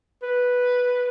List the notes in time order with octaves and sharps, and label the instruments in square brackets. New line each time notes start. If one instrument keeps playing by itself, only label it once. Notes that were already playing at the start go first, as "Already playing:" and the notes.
[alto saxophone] B4